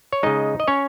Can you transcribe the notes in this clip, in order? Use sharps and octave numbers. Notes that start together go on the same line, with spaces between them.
C#5
C#3 G#3 D#4 D#5
D#5
C#4 C#5